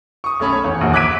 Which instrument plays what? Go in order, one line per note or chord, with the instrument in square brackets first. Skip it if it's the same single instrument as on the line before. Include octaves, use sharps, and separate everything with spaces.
[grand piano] C#6 D#6
B1 A3 C#4 B5
C#5
E2
A#1 D#2 F#4
D6 F#6 G#6 B6 D7 D#7